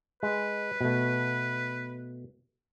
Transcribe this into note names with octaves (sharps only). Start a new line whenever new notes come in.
G#3 B4
B2 A3